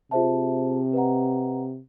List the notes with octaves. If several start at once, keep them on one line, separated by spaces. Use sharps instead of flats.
C3 F4 G#4 C5 E5 A5
B4 D#5 F#5 A#5